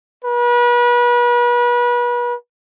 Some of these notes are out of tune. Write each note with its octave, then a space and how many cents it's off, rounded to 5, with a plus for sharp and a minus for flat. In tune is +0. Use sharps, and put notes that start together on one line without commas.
B4 -35